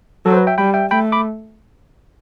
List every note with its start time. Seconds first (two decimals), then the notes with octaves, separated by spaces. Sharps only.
0.25 F#3 A4
0.32 C5
0.37 B4
0.47 E5 G5
0.58 G3 G5 B5
0.74 E5 G5
0.90 A3 G5 B5
1.12 B5 D6